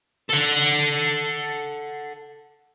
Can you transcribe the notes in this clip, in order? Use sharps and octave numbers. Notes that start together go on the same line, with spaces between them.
A4 F#5